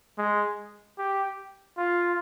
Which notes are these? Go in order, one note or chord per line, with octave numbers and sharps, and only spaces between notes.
G#3
G4
F4